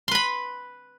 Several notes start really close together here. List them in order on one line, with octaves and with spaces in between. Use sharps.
C6 B4 B5